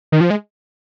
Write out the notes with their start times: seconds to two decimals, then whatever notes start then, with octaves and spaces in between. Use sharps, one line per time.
0.12 D#3
0.21 F3
0.30 G#3